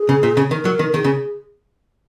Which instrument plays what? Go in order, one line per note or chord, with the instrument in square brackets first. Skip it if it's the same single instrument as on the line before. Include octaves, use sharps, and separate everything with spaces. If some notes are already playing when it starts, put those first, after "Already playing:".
Already playing: [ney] G#4
[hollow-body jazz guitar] C#3
A#2
C#3
[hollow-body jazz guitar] D#3 [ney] A#4
[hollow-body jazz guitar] F#3
D#3
[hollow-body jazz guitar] D#3 [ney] G#4
[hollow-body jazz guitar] C#3